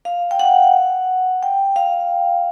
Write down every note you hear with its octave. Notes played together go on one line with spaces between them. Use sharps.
F5
G5
F#5
G5
F5